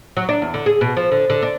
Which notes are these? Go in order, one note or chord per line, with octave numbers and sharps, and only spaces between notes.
F#3
D4
E2
D3
G#4
B2
F3
D3
D3
D4